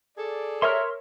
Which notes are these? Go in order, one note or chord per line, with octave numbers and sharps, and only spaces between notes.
G#4 A4 D5
A#4 C#5 E5 C6 F6